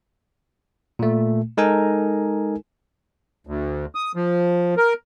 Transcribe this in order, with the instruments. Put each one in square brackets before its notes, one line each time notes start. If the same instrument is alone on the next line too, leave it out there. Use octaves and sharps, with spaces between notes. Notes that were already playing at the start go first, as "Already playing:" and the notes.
[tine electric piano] A#2 A3
G#3 D#4 A4 A#4 G#5
[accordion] D2
D#6
F3
A#4